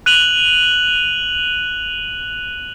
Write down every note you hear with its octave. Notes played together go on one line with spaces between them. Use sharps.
F#6 D#7 F7 F#7